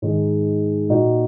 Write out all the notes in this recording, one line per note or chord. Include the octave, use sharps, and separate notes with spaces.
G#2 D#3 G#3
A#2 A#3 D#4 F#4